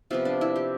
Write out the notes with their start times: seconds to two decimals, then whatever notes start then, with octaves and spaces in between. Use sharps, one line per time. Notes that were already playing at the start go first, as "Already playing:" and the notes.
0.11 C3 F3 B3 F4
0.25 D4
0.41 E4
0.56 G4